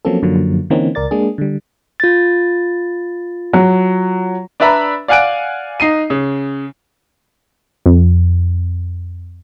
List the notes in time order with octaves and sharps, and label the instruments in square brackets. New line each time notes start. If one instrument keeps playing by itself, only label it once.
[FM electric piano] F3 F#3 A#3 C4 C#4 A4
F#2 D3 F3 F#3 A#3
D3 E3 A#3 C4 C#4 D#4
C#2 A#4 D5 A6
G#3 A#3 D4 G#4
D3 G3
[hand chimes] F4 A6
[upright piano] F#3
[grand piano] D4 B4 D5 E5 A#5 B5
D5 F5 F#5 G#5 F#6 D7
D#4 C7 D#7
C#3
[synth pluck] F2